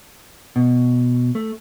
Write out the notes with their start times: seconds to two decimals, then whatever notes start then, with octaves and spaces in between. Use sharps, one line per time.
0.56 B2
1.35 A3